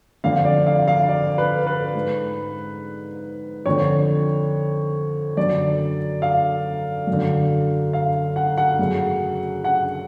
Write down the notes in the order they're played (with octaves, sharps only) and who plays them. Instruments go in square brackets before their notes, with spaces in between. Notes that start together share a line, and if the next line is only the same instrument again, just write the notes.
[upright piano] F2 D3 F5
D5
F5
F5
D5
B4
B4
G#2
F2 D3 C#5
F#2 D3 D5
F5
F#2
D3
F5
F#5
F#5
F#2 C#3
F#5